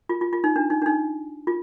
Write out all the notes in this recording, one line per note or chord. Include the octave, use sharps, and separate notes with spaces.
F4
F4
F4
D#4
D4
D#4
D4
D#4
F4